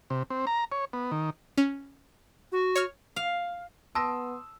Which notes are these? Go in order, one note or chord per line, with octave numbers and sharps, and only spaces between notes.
C3
C4
A#5
C#5
B3
D#3
C#4
F#4
C#5 C#6 F6
F5
B3 A5 C6 D#6 E6 A#6